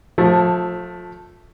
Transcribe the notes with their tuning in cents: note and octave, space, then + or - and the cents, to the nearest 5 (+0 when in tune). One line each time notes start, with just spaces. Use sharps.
F3 +30 A3 +0